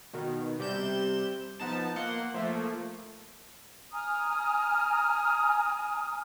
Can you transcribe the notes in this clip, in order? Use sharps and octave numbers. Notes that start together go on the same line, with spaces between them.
B2 D#3
C3 G3 G6 E7
F3 B3 D#4 A5
A#3 F#5 C6
F3 A3 A#3
G#5 A#5 D#6 F6